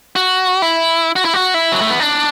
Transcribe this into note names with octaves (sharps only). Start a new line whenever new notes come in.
F#4
E4
F#4
E4
F#4
E4
F#3
A3
B3
D4